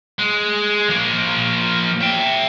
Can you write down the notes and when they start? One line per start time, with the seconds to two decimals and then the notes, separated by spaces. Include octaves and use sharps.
0.19 G#3
0.89 F3 A#3
2.01 E5 G5